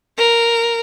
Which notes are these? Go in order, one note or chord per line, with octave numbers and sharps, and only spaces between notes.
A#4